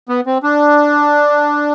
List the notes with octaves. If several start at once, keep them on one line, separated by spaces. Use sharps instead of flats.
B3
C4
D4